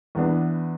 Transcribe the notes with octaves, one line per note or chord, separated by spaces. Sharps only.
E2 E3 B3 D4